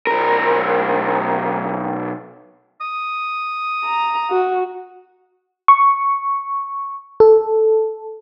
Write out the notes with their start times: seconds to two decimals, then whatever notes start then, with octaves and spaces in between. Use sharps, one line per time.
0.07 B1 A#4
2.81 D#6
3.85 A#5
4.31 F#4
5.68 C#6
7.20 A4